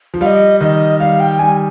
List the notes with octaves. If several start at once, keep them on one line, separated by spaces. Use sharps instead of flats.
F3
G3 D#5 F5
D#3 D#5
G3 F5
G5
G3 G#5